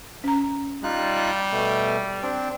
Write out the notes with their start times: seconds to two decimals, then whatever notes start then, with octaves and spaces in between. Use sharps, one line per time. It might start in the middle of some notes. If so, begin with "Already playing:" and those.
0.24 C#4 A#5
0.84 G3 D#4 F4 F#6
1.52 B2 A3
2.22 C4 D4